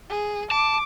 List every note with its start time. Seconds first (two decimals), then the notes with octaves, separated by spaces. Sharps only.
0.10 G#4
0.51 A5 D6